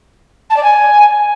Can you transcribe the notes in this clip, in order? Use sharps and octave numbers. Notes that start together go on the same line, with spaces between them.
A5
D5
G#5